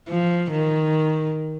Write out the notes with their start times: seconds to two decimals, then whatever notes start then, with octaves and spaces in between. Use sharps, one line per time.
0.09 F3
0.51 D#3